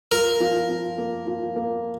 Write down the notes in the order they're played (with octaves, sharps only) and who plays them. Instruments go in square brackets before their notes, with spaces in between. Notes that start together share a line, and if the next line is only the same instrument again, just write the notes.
[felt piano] F4 [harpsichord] A#4
[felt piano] F3
F3
A#3
F3
A#3